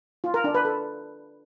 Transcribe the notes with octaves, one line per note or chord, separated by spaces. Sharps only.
F4
A#4
D4
B4
A4